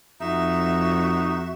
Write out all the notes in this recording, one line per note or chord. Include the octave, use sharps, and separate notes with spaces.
F2 D#4 F#4 E5